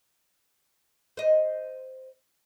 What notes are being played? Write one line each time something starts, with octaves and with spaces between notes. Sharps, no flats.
C5 D#5